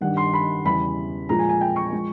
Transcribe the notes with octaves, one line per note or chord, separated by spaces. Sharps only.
G2 D#3 G3 F#5
C6
B5
E2 C#3 E3 G3 B5
A#2 F3 G#3 A#5
G#5
G#5
G5
C#6
F3 G#3